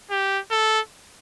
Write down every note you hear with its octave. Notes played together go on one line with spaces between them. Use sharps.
G4
A4